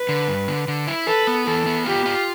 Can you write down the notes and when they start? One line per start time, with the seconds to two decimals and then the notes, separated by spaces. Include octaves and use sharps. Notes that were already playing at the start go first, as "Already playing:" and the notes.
Already playing: B4
0.09 D3
0.28 G2
0.48 D3
0.68 D3
0.87 E4
1.07 A4 B4
1.27 B3
1.47 E3 A4
1.66 B3
1.86 F4 G4
2.06 F4